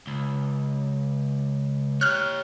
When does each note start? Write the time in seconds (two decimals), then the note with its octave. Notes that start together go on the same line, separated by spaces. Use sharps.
0.07 C#2
2.01 G4 C#5 F6 F#6